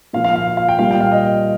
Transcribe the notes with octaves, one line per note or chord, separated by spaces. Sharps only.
A#2 F3 F5
F5
F5
F5
G5
A#2 G3 F5
G5
F5
D#5